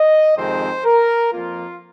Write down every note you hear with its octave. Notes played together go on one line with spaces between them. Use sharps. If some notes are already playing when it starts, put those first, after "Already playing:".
Already playing: D#5
F2 C3 D#3 G#3 C4 C5
A#4
F2 F3 A#3 F4